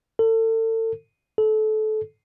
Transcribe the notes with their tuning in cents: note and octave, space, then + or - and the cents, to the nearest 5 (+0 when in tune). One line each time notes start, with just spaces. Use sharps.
A4 +35
A4 -25